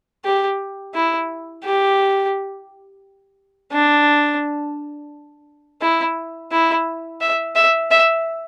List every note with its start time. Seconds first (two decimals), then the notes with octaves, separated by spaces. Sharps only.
0.25 G4
0.94 E4
1.64 G4
3.73 D4
5.82 E4
6.52 E4
7.21 E5
7.56 E5
7.91 E5